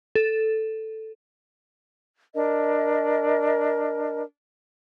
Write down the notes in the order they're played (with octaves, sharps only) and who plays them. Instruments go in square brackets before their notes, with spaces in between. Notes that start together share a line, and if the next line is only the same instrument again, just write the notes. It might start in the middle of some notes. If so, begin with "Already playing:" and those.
[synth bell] A4
[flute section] D4 A#4 D#5